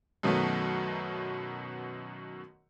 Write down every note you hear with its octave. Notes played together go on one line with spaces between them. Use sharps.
F#2 B2 D#3 F#3 A3 B3